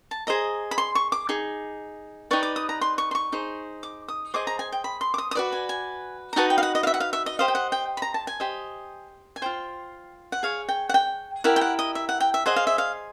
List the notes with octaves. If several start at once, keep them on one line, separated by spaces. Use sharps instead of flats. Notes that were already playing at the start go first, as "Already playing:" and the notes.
A5
G#4 C5 D#5 A#5
B5
C6
C#6
D6
D#4 G#4
D#4 G4 B4 D5 C#6
D6
D#6
A#5
C6
C#6
C6
C#6
D#4 G#4 C5
D6
D#6
G#4 C5 D#5 D6
A#5
G#5
G5
B5
C6
D6
D#6
D#6
F#4 B4 D5 D6
G#5
G#5
A#5
D#4 F#4 B4 D#5 A5
G5
F5
F#5
D#5
F5
E5
F#5
F5
E5
D#5
G4 C5 D#5 F5
G5
F#5
G5
B5
A#5
A5
G#5
G4 C5 D#5
G#5
F4 G#4 C5 G5
F#5
G#4 C#5 F5
G5
F#5
G5
E4 G4 A#4 F#5
G5
F#5
D#5
E5
F#5
G5
E5
G#4 C5 D#5 F#5
F5
E5
F5